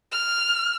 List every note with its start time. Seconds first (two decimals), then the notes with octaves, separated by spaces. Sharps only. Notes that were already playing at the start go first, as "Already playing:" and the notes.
0.12 F6